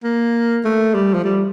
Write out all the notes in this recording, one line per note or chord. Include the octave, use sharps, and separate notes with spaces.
A#3
A3
G3
F3
G3